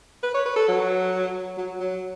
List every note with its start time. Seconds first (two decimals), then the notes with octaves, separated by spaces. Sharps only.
0.23 B4
0.34 C#5
0.46 B4
0.56 A4
0.68 F#3
1.58 F#3
1.80 F#3